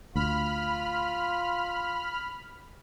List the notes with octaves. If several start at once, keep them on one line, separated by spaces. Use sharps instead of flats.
D2 F4 B5 F6